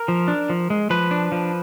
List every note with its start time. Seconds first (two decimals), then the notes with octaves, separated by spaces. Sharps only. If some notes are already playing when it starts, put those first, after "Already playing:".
Already playing: A#4
0.08 F3
0.28 D4
0.50 F3
0.70 G#3
0.90 F3 B4
1.11 D4
1.32 F3